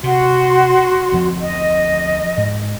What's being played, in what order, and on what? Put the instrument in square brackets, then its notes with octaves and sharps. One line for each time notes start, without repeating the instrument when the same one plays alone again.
[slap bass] C3 [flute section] F#4 C6
[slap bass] D2 F3 C4
[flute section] D#5
[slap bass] G#2